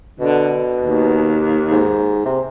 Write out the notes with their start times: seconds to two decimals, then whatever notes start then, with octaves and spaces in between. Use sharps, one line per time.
0.20 B2 D3
0.80 D#2
1.71 G#2
2.25 C3